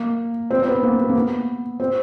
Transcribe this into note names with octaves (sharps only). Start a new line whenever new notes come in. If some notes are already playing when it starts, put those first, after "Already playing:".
Already playing: A#3
C4
C4
B3
A#3
B3
A#3
B3
C4